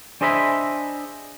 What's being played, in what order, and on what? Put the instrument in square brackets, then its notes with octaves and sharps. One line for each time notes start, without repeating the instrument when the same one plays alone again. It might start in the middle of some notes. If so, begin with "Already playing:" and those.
[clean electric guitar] D4 G#4 C5 D#5 E5 B5